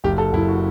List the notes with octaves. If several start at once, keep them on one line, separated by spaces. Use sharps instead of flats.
F#1 G4
A4
F#1 E4
F#4